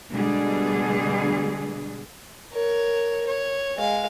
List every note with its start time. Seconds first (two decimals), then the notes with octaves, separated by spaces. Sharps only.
0.10 B2 D3 G3 G#3 D4 G#4
2.53 A#4 C#5
3.26 C#5
3.78 G#3 F5